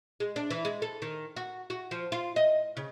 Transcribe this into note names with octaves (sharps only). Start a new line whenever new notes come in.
G#3
D4
E3
G#3
A4
D#3
F#4
F#4
F3
F4
D#5
C#3